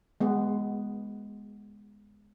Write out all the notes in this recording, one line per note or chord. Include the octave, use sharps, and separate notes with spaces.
G#3 B3